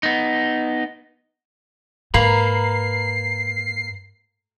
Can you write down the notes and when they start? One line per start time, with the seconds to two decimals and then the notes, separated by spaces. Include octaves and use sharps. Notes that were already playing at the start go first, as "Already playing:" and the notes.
0.03 B3 D#4
2.14 G#2 A#3 B4 A#5 B5 C7